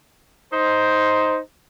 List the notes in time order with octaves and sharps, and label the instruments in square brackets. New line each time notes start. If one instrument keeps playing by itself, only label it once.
[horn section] D#4 C5